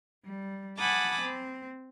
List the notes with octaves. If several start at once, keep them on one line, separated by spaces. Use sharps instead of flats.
G3
F#5 G#5 A5 B5 D6 D#6
C4